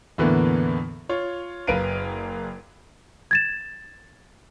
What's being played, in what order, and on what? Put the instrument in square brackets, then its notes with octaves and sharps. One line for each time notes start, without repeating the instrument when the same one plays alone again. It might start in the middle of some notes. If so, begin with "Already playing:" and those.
[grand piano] E2 A2 D3 E3 A#3 B3
F4 C#5
F#1 A#4 B4 F5 D7 D#7
[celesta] G#6 A6 E7